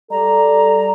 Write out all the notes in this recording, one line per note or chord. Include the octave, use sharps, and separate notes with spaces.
G3 A4 D5 A#5